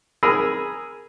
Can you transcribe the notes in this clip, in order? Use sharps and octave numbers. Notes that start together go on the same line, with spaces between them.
G#4 A#4 G#5 B5 E6